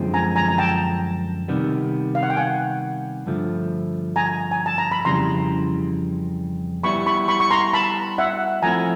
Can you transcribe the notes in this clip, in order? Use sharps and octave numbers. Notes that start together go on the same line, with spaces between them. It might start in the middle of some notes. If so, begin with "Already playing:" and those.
Already playing: F#2 D3 F3 G#3 C4
G#5 A#5
G#5 A#5
A#5
G5 A5
C3 D#3 G3 B3
F5
F#5
G5
F#5 G#5
G2 D3 F3 A3
G#5 A#5
G#5
A5
A#5
B5
F2 C#3 E3 G3 A#5 C6
G3 B3 E4 B5 C#6
B5 C#6
B5 C#6
C#6
A#5 C6
A5 B5
E5 F#5
F3 A3 C4 E4 G#5 A#5